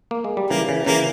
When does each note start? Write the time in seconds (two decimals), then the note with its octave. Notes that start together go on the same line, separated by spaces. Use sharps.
0.11 A#3
0.24 G#3
0.37 G3
0.50 C#3 E3 A#3
0.69 C#3 E3
0.86 C#3 E3 A#3